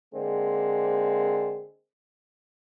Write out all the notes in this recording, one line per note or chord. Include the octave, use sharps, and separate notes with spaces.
D3 G#3 A#3 C4